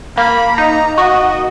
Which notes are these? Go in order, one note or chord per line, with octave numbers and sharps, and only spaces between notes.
A#3 B5
D#4 A#5
F#4 D#5